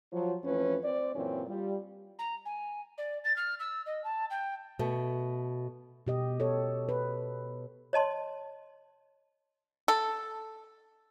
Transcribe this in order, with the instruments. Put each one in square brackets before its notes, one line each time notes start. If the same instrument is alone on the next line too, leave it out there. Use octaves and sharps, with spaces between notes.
[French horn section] F3 F#3
F2 E3 F3 A3 C#4 B4
C4 D5
F#2 A#2 E3 C4 C#4
G3 F4
[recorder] A#5
G#5
D5
A6
F6
E6
D#5
A5
G5
[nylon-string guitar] B2 A3
[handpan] B2 G4 D#5
A4 C#5
B4
[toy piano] C#5 D#5 A5 C6
[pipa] A4